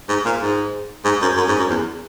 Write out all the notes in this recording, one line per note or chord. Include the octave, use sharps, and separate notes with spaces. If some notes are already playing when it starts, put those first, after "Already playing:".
G#2
A#2
G#2
G#2
F#2
F#2
G#2
F#2
E2